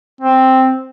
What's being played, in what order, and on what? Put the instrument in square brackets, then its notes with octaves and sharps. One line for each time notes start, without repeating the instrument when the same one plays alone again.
[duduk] C4